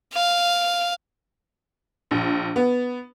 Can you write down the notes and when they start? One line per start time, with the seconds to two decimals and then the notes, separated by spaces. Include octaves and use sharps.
0.14 F5
2.11 A#1
2.56 B3